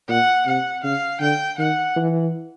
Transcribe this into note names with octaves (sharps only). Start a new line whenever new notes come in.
A#2 F#5
C3 F#5
C#3 F5
D3 G5
D#3 F#5
E3